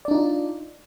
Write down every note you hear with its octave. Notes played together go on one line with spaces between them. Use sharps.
D4 D#4 F4 D5